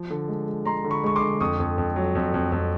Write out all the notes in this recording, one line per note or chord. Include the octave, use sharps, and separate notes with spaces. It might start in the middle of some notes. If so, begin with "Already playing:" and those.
Already playing: F3
D3
G#3
G#3
G#3 A#5 C6
D3
B5 C#6
G#3 C#6
C6 D6
D3
F2 C#6 D#6
F2
F2
F#3
F2
F2
F2